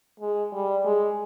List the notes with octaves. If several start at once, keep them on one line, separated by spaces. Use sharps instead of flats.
G#3
G3
G#3